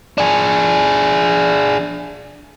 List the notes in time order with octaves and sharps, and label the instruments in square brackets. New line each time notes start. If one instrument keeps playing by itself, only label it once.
[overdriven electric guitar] D4 G#4